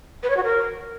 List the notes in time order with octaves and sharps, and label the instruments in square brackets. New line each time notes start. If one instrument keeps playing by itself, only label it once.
[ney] B4
C#5
F#4
A#4